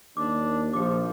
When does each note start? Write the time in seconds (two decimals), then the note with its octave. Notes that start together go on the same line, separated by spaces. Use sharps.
0.17 D#2 D4 D6
0.73 A#1 F3 G4 D6